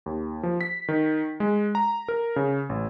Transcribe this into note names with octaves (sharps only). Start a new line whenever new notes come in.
D#2
F3
B6
D#3
G#3
A#5
A#4
C#3
A1